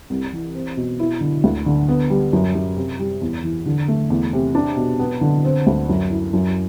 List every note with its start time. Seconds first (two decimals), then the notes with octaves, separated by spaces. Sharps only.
0.10 C2
0.33 E3
0.55 C4
0.77 B2
0.99 E4
1.21 D3
1.44 D2
1.66 D3
1.89 B3
2.10 G3
2.33 F#2
2.55 F#2
2.77 C3
2.99 G3
3.21 E2
3.44 E3
3.66 D3
3.88 A3
4.10 E2
4.33 C3
4.55 D4
4.77 B2
4.99 B3
5.21 D3
5.45 C4
5.67 D2
5.89 F#2
6.10 E4
6.33 F#2